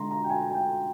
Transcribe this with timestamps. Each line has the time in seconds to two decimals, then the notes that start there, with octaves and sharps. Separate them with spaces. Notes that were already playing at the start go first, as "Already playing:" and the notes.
Already playing: D3 G#3 A#5 C6
0.11 A#5
0.24 G5
0.30 G#5
0.50 G#5
0.54 G5